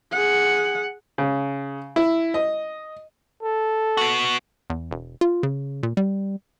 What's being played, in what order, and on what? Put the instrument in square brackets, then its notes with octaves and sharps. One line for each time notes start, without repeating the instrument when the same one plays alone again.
[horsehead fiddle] G#4 F#5
[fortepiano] C#3
E4
D#5
[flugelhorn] A4
[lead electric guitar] B3 F#4
[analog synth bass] E2
E1
F4
C#3
A#2
G3